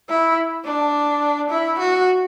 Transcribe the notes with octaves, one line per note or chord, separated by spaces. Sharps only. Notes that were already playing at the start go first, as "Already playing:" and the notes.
E4
D4
E4
F#4